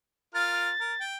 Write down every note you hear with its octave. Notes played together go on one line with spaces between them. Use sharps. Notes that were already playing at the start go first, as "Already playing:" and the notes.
F4 A#4 F6 A6
A#4
G5